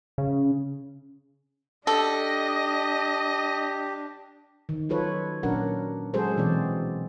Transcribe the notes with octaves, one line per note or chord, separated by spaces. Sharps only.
C#3
D4 G4 A4 D#5
D#3
F#3 F4 A4 B4 C#5
A#2 F#3 C#4 D4 A#4 F#5
F#3 G#3 F#4 G#4 A4 C5
B2 E3 C4 D5